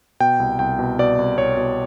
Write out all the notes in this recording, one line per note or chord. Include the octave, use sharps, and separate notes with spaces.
B2 G5
C2
C2 G5
B2
B2 D5
C2
C2 C#5
B2